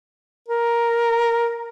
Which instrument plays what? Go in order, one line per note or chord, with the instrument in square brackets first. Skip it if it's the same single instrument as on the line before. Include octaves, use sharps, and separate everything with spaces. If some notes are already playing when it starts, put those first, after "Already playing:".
[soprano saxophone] A#4